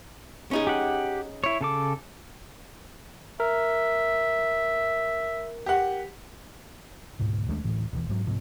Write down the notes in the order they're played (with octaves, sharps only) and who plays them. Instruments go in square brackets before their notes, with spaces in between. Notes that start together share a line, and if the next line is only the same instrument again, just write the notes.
[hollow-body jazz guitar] C#4 D#4 G#4
[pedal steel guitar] G4 F#5
E4 C#5
C#3 A4 D6
[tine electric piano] A#4 [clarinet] E5
[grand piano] G4 F#5
[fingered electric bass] D2 G#2 B2
D#2 G#3 A3 D4
D2 A2 E3
E1 E2
G#2 F#3
G#2 C3 F3